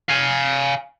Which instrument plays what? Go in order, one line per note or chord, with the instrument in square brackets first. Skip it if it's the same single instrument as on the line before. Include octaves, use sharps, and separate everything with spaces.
[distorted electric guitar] F5 G#5